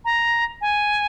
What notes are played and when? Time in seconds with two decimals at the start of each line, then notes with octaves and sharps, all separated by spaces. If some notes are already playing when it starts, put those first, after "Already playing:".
0.05 A#5
0.61 G#5